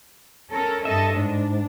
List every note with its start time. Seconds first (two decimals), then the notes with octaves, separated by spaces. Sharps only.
0.52 C#4 A4 A#4
0.85 G2 A4 D#5 E5
1.15 G#2 D4